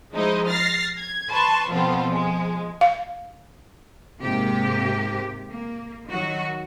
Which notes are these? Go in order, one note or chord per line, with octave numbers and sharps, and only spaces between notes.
F3 G#3 D#4 E4 C5 D#5
F6 A6 A#6 C7
G#6
B4 A5 C6 C#6
B2 F3 B3 C4 F4 A4
F3 G#3
F5
G#2 C3 A#3 G4
A#3
D#3 F#3 D#4 F#4